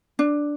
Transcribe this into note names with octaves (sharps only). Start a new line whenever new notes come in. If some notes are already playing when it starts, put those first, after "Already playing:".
D4